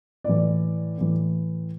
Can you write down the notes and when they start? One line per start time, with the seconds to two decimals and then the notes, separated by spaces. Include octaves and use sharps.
0.24 A2 E3 D5
0.98 A2 E3